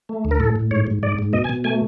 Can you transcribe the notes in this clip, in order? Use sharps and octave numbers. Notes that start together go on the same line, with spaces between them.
A3
D2
A#4
A2 A4
A2
G#2 C#5
G#2
G#2 D5
G#2
B2 D#5
G#5
B2
A3 G#5